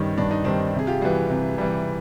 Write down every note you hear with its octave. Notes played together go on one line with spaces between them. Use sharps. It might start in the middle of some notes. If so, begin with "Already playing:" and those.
Already playing: G2 D#3 G3 C#4 D#4
G2 D4
D#4
D#3 G3 C4 D4
C3 G#4
F4 G4
E3 G3 F#4 G#4
C3
E3 G3